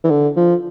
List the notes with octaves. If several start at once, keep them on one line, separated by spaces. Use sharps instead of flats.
E3
D3
F3